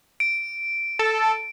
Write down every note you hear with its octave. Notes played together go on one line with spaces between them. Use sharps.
D7
A4